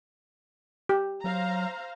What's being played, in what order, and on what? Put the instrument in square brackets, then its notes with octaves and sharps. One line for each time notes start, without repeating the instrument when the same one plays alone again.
[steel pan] G4
[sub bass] F#3 [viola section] C5 F5 A#5